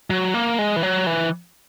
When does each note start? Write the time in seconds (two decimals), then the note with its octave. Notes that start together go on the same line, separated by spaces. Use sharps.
0.10 F#3
0.34 A#3
0.59 G#3
0.76 E3
0.83 F#3
1.07 E3